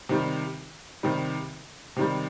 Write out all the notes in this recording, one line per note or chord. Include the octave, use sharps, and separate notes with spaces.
C3 D#3 G3
C3 D#3 G3
C3 D#3 G3